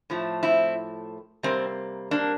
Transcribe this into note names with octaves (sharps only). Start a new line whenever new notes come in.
A2 F3 A3
C4 E4
C3 G3 A#3 C4
A#3 D4